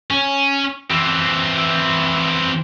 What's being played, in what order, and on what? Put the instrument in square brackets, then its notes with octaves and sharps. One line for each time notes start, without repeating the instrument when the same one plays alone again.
[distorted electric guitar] C#4
E3 C4